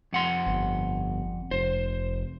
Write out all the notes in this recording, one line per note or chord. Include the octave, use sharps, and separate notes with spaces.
F2 F#5 C6
G1
F1 C5